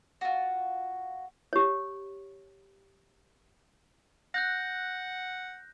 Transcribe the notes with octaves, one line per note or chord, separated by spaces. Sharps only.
F4 F#4
G4 C#5
F#5 F#6 G6 A#6